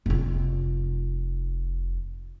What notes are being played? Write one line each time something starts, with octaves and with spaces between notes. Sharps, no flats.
F1 F4